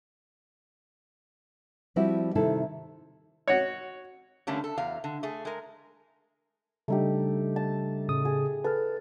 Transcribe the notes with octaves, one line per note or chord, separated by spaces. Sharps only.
F3 G3 C4 E4 F#4
C3 D#3 G3 E4 A4
F#4 C#5
D3 G3 A3 A#3 C#4
A4
E2 F#3 F5
D3
A3 G#4
G#3 A#4
C#3 G3 A3 D4 D#4 G4
A5
A2 C#3 D#6
G#4
A4 B4 F6